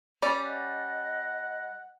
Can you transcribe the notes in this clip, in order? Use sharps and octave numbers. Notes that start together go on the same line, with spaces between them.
G3 C#4 D5
D#5 F#5